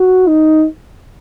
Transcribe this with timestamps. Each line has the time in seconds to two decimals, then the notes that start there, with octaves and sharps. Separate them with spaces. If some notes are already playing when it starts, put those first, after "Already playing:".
Already playing: F#4
0.27 D#4